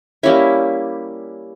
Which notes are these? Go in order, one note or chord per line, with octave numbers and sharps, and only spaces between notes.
G3 A#3 C#4 E4